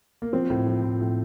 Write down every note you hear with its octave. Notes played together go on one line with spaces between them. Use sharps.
A#3
F3 C4
A2
F3
A2
A2